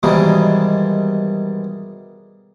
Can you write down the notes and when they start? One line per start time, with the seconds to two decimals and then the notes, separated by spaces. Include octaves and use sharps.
0.03 G#2 B2 D#3 E3 G3